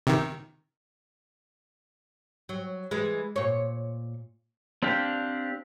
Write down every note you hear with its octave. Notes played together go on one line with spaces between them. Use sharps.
C3 D#3
F#3
E3 G#3
A#2 C#5
C4 D4 G4 F5